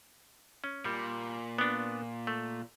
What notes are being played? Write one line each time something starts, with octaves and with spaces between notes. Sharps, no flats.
C#4
A#2 G3
B3 D4
A3